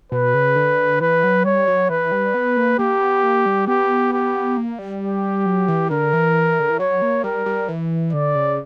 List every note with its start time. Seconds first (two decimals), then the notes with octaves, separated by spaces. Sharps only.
0.12 B2 B4
0.34 C#3
0.56 D3
1.00 E3 B4
1.23 F#3
1.45 G3 C#5
1.68 F#3
1.89 E3 B4
2.12 G3
2.34 B3
2.57 A#3
2.79 A#3 G4
3.01 B3
3.23 A#3
3.46 G3
3.67 B3 G4
4.13 G4
4.57 A#3
4.79 G3
5.01 G4
5.46 F#3
5.68 E3
5.90 D3 A#4
6.13 E3
6.60 D3
6.70 E3
6.80 F#3 C#5
7.02 A#3
7.24 G3 A#4
7.46 G3
7.68 E3
8.13 D3 D5
8.35 C#3